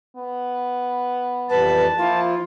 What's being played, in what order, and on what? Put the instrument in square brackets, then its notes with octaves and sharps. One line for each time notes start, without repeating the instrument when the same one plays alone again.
[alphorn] B3
[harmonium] F2 E3 G3 [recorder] B4 [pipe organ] A5
[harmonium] F3 E4 [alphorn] A#3 [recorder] F4